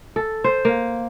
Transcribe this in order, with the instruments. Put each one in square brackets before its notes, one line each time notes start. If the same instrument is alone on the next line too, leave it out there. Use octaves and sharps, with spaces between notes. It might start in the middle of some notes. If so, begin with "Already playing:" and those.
[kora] A4
C5
A#3